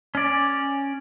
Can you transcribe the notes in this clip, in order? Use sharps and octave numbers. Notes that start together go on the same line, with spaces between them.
C#4 D5